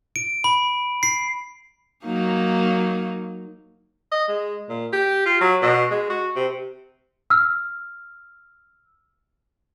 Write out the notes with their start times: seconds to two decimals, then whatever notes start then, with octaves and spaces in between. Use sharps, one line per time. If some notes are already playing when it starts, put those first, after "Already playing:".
0.16 D7
0.44 B5
1.03 C7
2.05 F#3 A#3 D#4
4.11 D#5
4.28 G#3
4.69 A#2
4.93 G4
5.25 F4
5.41 F#3
5.62 B2
5.90 G#3
6.10 F#4
6.36 C3
7.30 E6 F6